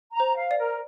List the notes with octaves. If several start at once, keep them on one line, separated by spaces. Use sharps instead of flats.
A#5
C5
F5
D5
A#4